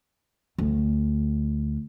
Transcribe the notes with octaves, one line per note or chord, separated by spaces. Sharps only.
D2 D3